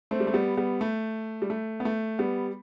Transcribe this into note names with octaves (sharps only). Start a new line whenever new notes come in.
A3 C4
G3
A3
G3 B3
G3 B3
A3
G3
A3
B3
A3
G3 B3